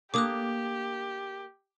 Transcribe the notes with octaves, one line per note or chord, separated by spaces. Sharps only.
A#3 D4 G4 D6 D#6 F#6